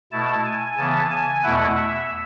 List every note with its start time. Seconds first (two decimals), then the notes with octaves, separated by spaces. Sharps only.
0.12 B2 A3 E4 A5
0.45 G#5
0.77 C#3 E3 B3 A5
1.10 G#5
1.43 E2 B2 A3 E4 F#5
1.76 E5